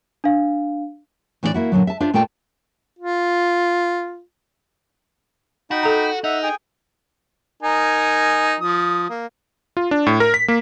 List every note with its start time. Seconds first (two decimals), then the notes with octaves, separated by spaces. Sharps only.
0.24 D4 F5
1.43 A2 E3 D4 E4 D5
1.54 A#3 E4 F#4
1.72 A#2 D3 D#3 F#3
1.87 E5 A5
2.00 D4 F4 C5 E5
2.13 A#2 A3 F4 D5 G5 A5
2.99 F4
5.71 D#4 F#4 G5 B5
5.83 A4 A#5
6.24 D#4 E5 F#5
6.43 G#4 G5 G#5
7.63 D#4 A#4 G#5
8.60 F3 D#6
9.10 A#3
9.77 F4
9.91 D4
10.06 A2
10.20 A#4
10.34 B6
10.48 A#3